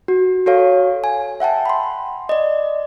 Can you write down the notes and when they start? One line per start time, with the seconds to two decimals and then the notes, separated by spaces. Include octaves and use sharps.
0.08 F#4
0.46 F#4 A4 C#5 F5
1.04 G#5
1.40 E5 F#5 G5 A5
1.66 B5 C6
2.29 D5 D#5